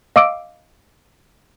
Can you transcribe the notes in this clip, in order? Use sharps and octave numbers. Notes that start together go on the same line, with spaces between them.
D#5 F5 D6 E6 D7